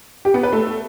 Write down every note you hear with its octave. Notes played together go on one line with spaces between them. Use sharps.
G4
B3
B4
A3